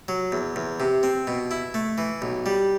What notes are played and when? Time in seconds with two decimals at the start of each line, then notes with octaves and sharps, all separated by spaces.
0.08 F#3
0.32 E2
0.56 E2
0.80 C3
1.03 C4
1.27 B2
1.51 E4
1.74 A3
1.98 E3
2.22 B1
2.46 G3